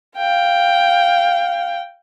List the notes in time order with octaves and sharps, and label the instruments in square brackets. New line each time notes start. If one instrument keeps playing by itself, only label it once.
[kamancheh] F5 G5